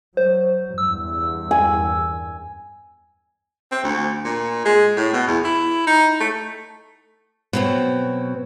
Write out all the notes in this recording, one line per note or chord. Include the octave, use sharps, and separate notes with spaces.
F#3 C5
E2 G2 E6
G#5
C4
D2
A#2
G#3
A2
B2
E2
E4
D#4
A3
B2 F#3 C4